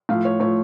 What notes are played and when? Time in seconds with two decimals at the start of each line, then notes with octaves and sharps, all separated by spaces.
0.09 A2 F3 F5
0.25 C#5
0.40 A2 F3 C#5